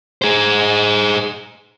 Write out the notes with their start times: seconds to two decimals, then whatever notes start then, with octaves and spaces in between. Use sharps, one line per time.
0.22 G#4 C5